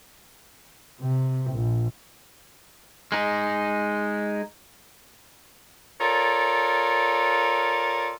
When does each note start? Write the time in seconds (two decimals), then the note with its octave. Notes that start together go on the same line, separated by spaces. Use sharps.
1.01 C3
1.51 A#1
3.12 G#3 D#4
6.00 F4 A4 A#4 C#5 D5